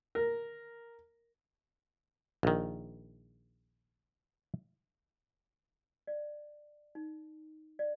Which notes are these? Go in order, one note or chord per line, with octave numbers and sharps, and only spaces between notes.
A#4
A#1 D#3
D5
D#4
D5